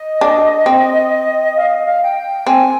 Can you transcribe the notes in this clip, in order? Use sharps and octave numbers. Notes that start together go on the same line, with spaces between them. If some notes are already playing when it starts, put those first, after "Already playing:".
Already playing: D#5
D4
C4
F5
D#5
F5
G5
C4 G#5